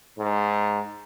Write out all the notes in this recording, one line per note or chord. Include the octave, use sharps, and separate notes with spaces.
G#2